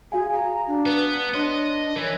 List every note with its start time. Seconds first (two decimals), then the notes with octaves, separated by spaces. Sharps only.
0.12 F#4 G#4 F5 G#5
0.33 A#5
0.67 D4
0.86 B3 B4
1.34 D4 C#5 D#5 C6 F#6
1.96 E3 A#4 C#5